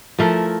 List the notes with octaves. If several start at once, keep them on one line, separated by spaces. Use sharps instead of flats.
F3 A3 E4 A#4